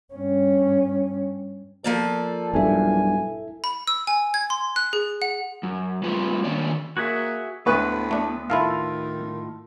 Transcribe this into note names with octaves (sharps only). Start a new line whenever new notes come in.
G2 C#4
F3 A#3 A4 D5
B1 G2 E4 A4 E5 G#5
B5
E6
G#5
G#6
C6
F#6
G#4
F#5
F#2
G3 A3 C4 F4 F#4 B4
D#3 A#3 C#4 D4 C#5 D5
A#3 F#4 G#4 E5
D2 A2 B3 B4 C#6
A3 D4
A2 D#3 E4 F4 A4 F5